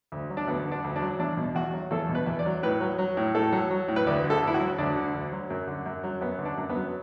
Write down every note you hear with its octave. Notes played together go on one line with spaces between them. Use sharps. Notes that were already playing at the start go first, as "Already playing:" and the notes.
D2
F#3
D4
D2 B3
D3
D4
D2
D4
F#3
E2 D4
B2
E2 F#4
F#3
E2 A4
B2
B4
E2
D5
F#3
A2 B4
F#3
F#3
A2
A2 A4
F#3
F#3
A2
B4
D2 D5
D3
A4
D2
E4
F#4
F#3
D2 D4
D3
D2
F#3
F#2
D3
F#2
F#3
F#2 B3
D3
D4
F#2
B3
F#3